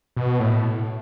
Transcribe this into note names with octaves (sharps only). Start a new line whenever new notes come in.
B2
A2